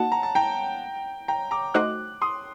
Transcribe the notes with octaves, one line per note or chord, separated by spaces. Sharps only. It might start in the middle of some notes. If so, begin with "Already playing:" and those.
Already playing: A#3 D#4 F#4 D#5 F#5 A5
A#5
A5
G5 A#5
G5 A#5
A#5 D6
A3 D#4 F#4 C5 D#5 D6 F#6
C6 D#6